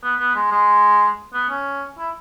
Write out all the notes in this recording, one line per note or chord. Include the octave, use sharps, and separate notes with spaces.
B3
B3
G#3
G#3
B3
C#4
E4